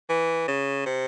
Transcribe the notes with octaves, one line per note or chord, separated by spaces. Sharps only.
E3
C#3
C3